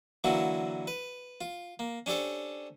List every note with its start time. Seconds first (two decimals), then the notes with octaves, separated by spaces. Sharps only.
0.24 D3 E3 F#3 A#3 E4 F#4
0.87 B4
1.41 F4
1.79 A#3
2.06 C#4 D4 G4 A4 C5